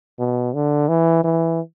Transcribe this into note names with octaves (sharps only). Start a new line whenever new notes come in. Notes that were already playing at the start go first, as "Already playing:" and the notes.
B2
D3
E3
E3